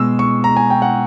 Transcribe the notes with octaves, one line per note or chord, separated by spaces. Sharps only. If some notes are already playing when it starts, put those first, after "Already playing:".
Already playing: B2 G#3 E6
C#6
A#5
G#5
G5
F#5